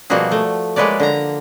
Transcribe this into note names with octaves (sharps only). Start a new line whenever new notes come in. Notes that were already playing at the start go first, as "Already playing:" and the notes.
B2 F3 G3 A#3 F#4 G#4
A3
G#3 A#3 B4 C#5 D5
D3 A#5